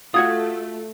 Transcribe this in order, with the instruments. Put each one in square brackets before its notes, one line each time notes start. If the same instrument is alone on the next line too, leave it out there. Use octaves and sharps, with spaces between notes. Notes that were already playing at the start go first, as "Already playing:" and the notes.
[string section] A3 [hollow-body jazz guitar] F4 F#4 F#5 [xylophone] D#6 G#6